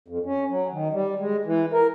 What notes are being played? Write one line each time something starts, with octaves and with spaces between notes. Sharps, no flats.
F2
C#4
F#3
D#3
G3
G#3
E3
A#4